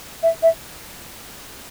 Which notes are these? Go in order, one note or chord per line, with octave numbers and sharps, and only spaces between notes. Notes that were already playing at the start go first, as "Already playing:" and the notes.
E5
E5